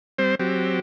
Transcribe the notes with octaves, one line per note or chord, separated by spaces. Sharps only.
G3 C4 C5
F#3 C4 G4